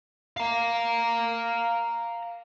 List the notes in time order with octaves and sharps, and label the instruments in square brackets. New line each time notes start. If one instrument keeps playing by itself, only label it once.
[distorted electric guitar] F5 A#5